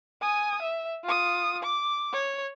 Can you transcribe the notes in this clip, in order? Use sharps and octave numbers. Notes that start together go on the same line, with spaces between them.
G#5 D#6
E5
F4 D#6
D6
C#5